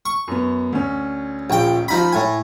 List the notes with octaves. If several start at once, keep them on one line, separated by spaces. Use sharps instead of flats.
C#6
F#2 B3
D2 C#4
A#1 G5
F3 D#4 B5
A2 G#5